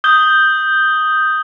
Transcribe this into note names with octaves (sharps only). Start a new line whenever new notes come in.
D#6 G6 G7